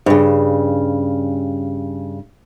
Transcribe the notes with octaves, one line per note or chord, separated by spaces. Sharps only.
G2 C#3